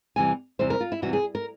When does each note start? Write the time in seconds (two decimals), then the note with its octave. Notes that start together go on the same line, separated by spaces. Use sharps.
0.16 E2 C3 E3 G3 G#5
0.59 E2 C3 E3 G3 C5
0.70 A#4
0.80 F4
0.92 E4
1.02 E2 C3 E3 G3 F#4
1.13 G#4
1.35 A#4